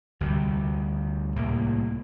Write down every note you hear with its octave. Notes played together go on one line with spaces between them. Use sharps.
D2 C3 G3
C2 A2 A#3